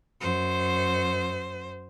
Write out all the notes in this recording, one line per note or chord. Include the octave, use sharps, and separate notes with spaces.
F#2 C5